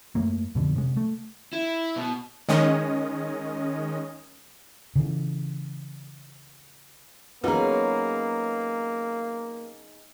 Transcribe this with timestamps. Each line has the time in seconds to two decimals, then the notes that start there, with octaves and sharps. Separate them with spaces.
0.15 F#2 A3 A#3
0.55 F2 B2 D3
0.76 C3 G#3
0.97 A3
1.53 E4
1.96 B2
2.49 D#3 G#3 C#4 D#5
4.96 C#3 E3
7.44 F#3 A#3 B3 C#4 D#4 G#4 B4 A#5